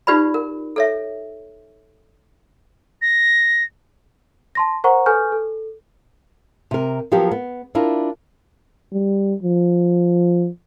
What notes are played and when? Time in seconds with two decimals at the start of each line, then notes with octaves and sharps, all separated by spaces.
0.07 D#4 F4 G4 B4 D5 B5
0.34 A#4
0.76 A4 C#5 E5
3.02 A#6
4.55 A5 C6 A#6
4.84 A#4 C5 F#5 A#5 C#6
5.06 A4 B4 G#5 C#6 F6 G6
5.32 A4
6.71 C3 A#4
7.12 F3 F#3 B3 G4 A#4
7.31 B3
7.75 D4 E4 F4 A#4
8.92 G3
9.43 F3